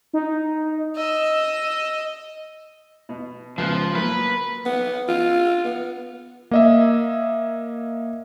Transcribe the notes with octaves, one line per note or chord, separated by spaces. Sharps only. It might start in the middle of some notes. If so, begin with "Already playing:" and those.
D#4
D#5 E6
B2
C#2 F3 B3 F#6
F#3 A#3 B4
B3
F4
B3
A#3 D#5 E5